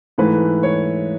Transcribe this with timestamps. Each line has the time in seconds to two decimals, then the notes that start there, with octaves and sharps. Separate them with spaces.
0.18 G#2 E3 A3 B4
0.63 C#5